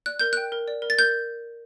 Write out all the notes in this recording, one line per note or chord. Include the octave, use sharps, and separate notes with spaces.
D5 F#6
A#4 G6
G5 F#6
A#4
D5
A#4
A6
A#4 G6